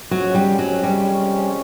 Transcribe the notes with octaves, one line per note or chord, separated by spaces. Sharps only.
F2 C3 F3 F#3 G#3 C#4
G3
F#3
G3